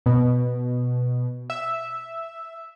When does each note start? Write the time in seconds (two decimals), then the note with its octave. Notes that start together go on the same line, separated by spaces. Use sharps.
0.06 B2
1.50 E5